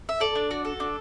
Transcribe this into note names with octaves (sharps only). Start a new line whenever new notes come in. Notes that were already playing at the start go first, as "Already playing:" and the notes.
E5
A4 D5
D4
F#4
A4
D4